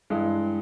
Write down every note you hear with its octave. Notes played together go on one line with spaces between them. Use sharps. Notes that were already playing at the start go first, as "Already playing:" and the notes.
G2 E3 G#3